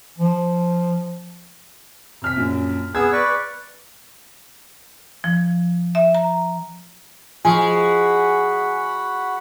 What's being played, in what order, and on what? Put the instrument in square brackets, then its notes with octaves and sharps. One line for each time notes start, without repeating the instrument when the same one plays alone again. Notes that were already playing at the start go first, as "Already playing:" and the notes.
[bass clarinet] F3
[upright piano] C3 F6 B6
A#1 F#2
[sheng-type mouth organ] B3 G#4 E6 [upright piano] G#6
[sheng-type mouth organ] B4 D5 C#6
[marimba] F3
E5
A#5
[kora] F3 [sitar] G#3 [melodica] F#4 F#5 B5 [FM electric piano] G#5